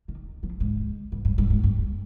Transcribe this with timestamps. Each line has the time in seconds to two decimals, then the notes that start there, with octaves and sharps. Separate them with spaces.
0.08 D#3
0.43 F3
0.60 G#2
1.12 G2
1.25 G2
1.38 G2
1.50 G#2
1.64 G2